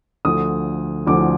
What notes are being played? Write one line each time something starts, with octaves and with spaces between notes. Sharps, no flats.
D2 D3 F3 D#6
D2 D3 F3 D6